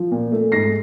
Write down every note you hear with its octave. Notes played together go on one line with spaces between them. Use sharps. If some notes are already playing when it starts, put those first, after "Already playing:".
Already playing: F3
A#2
A3
G#2 A#6 C7